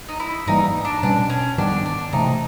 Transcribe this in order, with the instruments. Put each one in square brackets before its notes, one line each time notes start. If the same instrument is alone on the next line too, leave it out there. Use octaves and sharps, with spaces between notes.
[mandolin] D#4
E4
[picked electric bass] G#2 E3 G3 A#3 [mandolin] D#4
[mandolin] D4
[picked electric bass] B2 G3 A#3 C#4 [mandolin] D4
[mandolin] C#4
[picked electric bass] G#2 D#3 G3 B3 [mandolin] D4
[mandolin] D4
[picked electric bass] C3 E3 A3 [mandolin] D#4